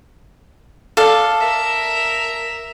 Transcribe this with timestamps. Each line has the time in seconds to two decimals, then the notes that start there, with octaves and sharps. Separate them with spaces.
0.97 A4 D5 F5
1.39 A#4 E5